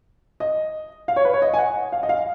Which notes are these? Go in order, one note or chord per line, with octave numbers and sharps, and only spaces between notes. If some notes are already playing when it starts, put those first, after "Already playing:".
D#5
F5
C#5
B4
C#5
D#5
G#5
F#5
F5
D#5
F5